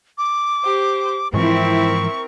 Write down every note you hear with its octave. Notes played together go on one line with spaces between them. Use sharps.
D6
G4 C5
G#2 E3 F3 C4 E4 A#4 C#6